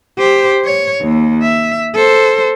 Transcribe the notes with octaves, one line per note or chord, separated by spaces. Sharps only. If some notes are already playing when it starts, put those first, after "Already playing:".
G4 C5
C#5
D#2
E5
A4 C5